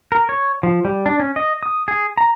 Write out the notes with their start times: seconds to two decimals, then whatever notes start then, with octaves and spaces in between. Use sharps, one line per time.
0.12 A#4
0.29 C#5
0.63 F3
0.85 G3
1.06 D4
1.20 C#4
1.36 D#5
1.63 D#6
1.88 G#4
2.18 A#5